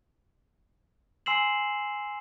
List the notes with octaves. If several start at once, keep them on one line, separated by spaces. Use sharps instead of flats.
G#5 C6 E6 C7 E7 F#7